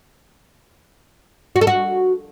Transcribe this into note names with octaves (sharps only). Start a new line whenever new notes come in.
F#4
A4
F#4